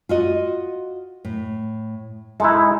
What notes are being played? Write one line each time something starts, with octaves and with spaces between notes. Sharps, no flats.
F4 F#4 D#5
A2
G#3 D#4 E4 A4